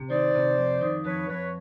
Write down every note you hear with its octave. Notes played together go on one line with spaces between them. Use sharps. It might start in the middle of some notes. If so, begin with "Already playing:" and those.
Already playing: C3
D#3 C5 D5
C3
F2
D#3
F2 B4 C#5
F2 B4 C#5